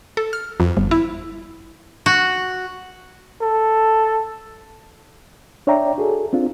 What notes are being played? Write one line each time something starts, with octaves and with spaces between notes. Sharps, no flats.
A4
F6
F2
G1
E4
F#4
A4
D4 C#5 D5 E5 G5 A#5
F#4 G#4 A4
C4 D4 F4